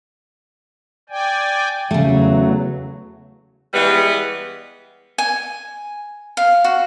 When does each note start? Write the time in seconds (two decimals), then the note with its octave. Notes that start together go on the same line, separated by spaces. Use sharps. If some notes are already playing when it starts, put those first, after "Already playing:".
1.09 D5 G5 G#5
1.91 E2 C#3 F#3 A3
3.74 E3 G3 G#3 B3
5.18 G#5
6.37 F5
6.64 F#4